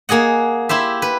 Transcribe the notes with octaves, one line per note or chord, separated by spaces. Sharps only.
A#3 G#4 D#5 F#5
E4 G4 C5 E5
B4